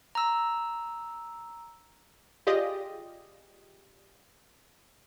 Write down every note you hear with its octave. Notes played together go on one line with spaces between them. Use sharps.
A#5 E6
F4 G4 G#4 D5 D#5